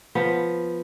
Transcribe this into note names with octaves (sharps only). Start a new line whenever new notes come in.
F3 B3